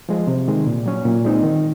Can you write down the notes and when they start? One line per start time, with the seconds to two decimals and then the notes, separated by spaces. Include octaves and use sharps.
0.09 F3 G#3
0.27 C3
0.48 D#3 G#3
0.66 A#2
0.86 F#3 C#4
1.05 A#2
1.25 G#3 C4 D#4
1.43 D#3